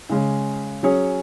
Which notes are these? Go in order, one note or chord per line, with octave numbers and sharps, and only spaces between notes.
C#3 G#3 C#4
F#3 C#4 G#4 C#5